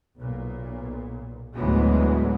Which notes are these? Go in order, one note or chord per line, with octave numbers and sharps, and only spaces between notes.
B1 A#2
D2 A2 E3 F#3 G#3 B3